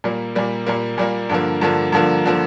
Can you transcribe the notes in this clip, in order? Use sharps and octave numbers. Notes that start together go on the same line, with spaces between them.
A#2 G3 A#3
A#2 G3 A#3
A#2 G3 A#3
A#2 G3 A#3
G2 D3 F3 A#3
G2 D3 F3 A#3
G2 D3 F3 A#3
D3 F3 A#3